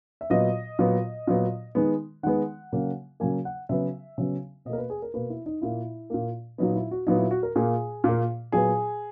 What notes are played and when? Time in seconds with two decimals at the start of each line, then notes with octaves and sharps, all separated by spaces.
0.21 E5
0.30 A#2 F#3 B3 D#5
0.79 A#2 F#3 B3
1.27 A#2 F#3 B3
1.75 D#3 G#3 B3
2.23 D#3 G#3 B3 F#5
2.73 C#3 F#3 A#3
3.20 C#3 F#3 A#3 G#5
3.45 F#5
3.69 C#3 F#3 B3 E5
4.18 C#3 F#3 B3
4.65 B2 D#5
4.70 A#3 A#4
4.78 B4
4.90 G#4
5.02 A#4
5.14 B2 A#3 B4
5.30 E4
5.46 D#4
5.62 A#2 A#3 E4
6.10 A#2 A#3
6.58 A#2 F#3 B3 D#4
6.76 E4
6.91 F#4
7.07 A#2 F#3 B3 D#4
7.19 E4
7.31 F#4
7.43 A#4
7.56 A#2 A#3 G#4
8.04 A#2 A#3
8.52 A#2 F#3 B3 G#4